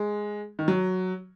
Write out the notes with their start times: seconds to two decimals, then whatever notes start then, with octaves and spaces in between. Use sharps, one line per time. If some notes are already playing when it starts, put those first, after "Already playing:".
Already playing: G#3
0.59 D#3
0.68 F#3